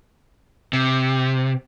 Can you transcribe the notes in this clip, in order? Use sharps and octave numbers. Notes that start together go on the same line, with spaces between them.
C3